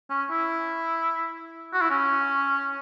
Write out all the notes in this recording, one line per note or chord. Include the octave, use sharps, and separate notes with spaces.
C#4
E4
F#4
E4
C#4